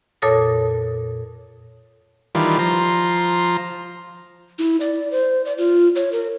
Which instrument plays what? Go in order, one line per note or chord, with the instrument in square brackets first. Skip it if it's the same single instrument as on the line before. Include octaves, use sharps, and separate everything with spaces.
[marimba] F2 A#2 A4 C#5 D#6 A#6
[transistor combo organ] D#3 E3 G3 F4
F3 A#5 C6
[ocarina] E4
D5
C5
D5
F4
C#5
A#4